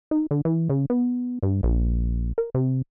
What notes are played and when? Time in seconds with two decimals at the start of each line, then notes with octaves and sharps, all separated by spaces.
0.11 D#4
0.31 D3
0.45 E3
0.70 C#3
0.90 B3
1.43 G2
1.63 A#1
2.38 A#4
2.54 C3